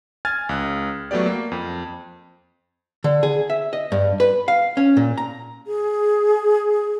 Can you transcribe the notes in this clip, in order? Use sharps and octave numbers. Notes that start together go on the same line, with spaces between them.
G#5 F6 G#6 A6
C#2 F#6
F#3 A3 B3 G4 D5
A#3
F2
D3
G#4
E5
D#5
G2
B4
F5
C#4
A#2
A#5
G#4